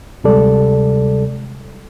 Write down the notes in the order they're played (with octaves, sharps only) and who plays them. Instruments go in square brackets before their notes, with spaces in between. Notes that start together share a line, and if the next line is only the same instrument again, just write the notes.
[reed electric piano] D2 C3 G3 G#3 A4 D5